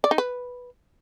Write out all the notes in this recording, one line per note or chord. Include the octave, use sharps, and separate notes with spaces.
D5
D#4
B4